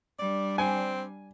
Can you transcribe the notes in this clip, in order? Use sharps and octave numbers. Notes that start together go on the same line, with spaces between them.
G3 D4 D5
C4 G#5